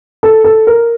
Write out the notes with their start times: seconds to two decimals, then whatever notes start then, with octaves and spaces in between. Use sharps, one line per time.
0.23 A4
0.44 A4
0.67 A#4